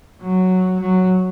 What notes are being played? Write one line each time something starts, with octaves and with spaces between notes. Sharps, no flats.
F#3
F#3